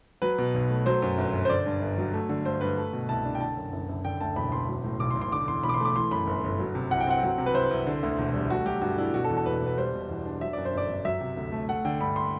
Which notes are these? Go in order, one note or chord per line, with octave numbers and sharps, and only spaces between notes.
F#3 B4
B2
B1
A3
F#3 C5
F#2
G1
G1
C5
D3 D5
G2
G1
F#3
A3
D3
G2 C5
G2 B4
A3
B2
C2 A5
D4
G5
D3 A5
F#2
F#1
F#1
D3 G5
D2 A5
E1 B5
E1 C6
F#3
A2
B1 D6
C6
B1
C6
D3 D6
E2 C6
E1 B5
D6
C6
A3
D6
E3 C6
F#2 B5
G1
G1
F#3
C3
C2 F#5
G5
C4 F#5
F#3
C3
B4
C2 C5
C2
D3
D2
E1
G3
A3 F#4
F#3 G4
G2 F#4
D4 E4
B2 F#4
A4
E2
A4
E1 B4
E1
B4
G3 C5
B2
E2
D4
F#3 E5
F#2 D5
C5
G1 D5
G1
F#3 E5
C3
D2
A3
A3 F#5
D3 G5
G2 B5
C6